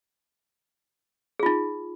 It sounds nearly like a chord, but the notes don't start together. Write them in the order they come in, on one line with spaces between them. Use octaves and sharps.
G#4 F4 D#4